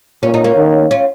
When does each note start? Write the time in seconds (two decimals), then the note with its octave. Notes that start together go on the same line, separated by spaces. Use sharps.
0.22 A#2 C#4
0.34 D#4
0.44 A#3 C#4
0.56 D#3
0.91 C#4 F4